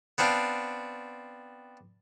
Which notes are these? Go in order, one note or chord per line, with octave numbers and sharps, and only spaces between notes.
B3 C4 D4 F4